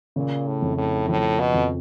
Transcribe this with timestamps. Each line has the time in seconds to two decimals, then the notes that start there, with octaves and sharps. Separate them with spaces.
0.16 A#2 C#3
0.47 A2
0.62 F2
0.77 A2
1.08 A2 F3
1.39 B2
1.54 F2